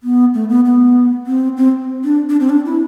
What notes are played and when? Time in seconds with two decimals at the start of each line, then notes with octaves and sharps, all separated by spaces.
0.03 B3
0.34 A3
0.49 B3
0.66 B3
1.27 C4
1.57 C4
2.04 D4
2.29 D4
2.40 C4
2.50 D4
2.65 E4